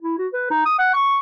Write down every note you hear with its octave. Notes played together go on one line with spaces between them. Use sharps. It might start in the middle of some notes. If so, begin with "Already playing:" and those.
E4
F#4
B4
D#4
D#6
F#5
C#6